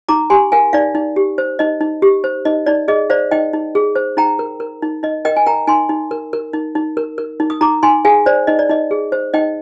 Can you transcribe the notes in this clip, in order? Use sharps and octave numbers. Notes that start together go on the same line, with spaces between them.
D#4 A#5 D6
G4 G#5 C6
A#4 F5 G#5
D#4 D5 F5
D#4
G4
C5
D#4 D#5
D#4
G4
C5
D#4 D#5
D#4 D5
G#4 D#5
C5 D5 F5
D#4 D#5 G5
D#4
G#4
C5
D#4 G5 A#5
A#4
A#4
D#4
D#4 D#5
A#4 D#5 G5
G#5
A#4 G5 A#5
D#4 G#5 C6
D#4
A#4
A#4
D#4
D#4
A#4
A#4
D#4
D#6
D#4 A#5 D6
D#4 G#5 C6
G#4 F5 G#5
C5 D5
D#4 D#5
D5
D#4 D#5
G#4
C5
D#4 D#5 G5